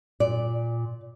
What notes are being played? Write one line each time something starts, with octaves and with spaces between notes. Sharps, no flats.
A#2 D5